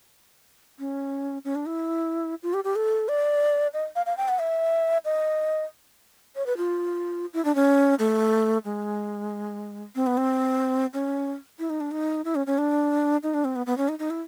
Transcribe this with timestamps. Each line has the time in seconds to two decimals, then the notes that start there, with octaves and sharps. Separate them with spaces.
0.79 C#4
1.45 C#4
1.55 D4
1.66 E4
2.43 F4
2.54 G4
2.64 G4
2.76 A4
3.08 D5
3.73 D#5
3.96 F5
4.06 F5
4.17 G5
4.28 F#5
4.39 E5
5.05 D#5
6.36 C#5
6.46 B4
6.57 F4
7.33 E4
7.45 D4
7.55 C#4
7.99 A3
8.65 G#3
9.95 C4
10.07 B3
10.17 C4
10.94 C#4
11.59 E4
11.70 D#4
11.81 D4
11.91 D#4
12.25 E4
12.35 C#4
12.47 C#4
12.58 D4
13.23 D#4
13.34 D4
13.45 C4
13.56 B3
13.66 B3
13.78 C#4
13.89 D#4
13.99 D#4
14.10 E4